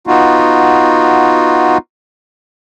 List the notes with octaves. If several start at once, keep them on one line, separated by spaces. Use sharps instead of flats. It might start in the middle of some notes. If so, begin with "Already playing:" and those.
B3 D#4 F4 F#4